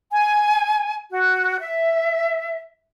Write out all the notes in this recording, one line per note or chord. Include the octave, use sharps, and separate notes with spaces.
G#5
F#4
E5